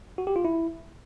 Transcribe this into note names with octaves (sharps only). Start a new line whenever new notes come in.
F#4
G4
F4
E4